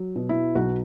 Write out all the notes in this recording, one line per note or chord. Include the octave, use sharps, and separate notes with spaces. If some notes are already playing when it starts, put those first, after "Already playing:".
Already playing: F#3
B2
E4
B1 F#4